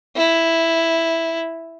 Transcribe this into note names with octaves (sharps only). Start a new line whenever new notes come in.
E4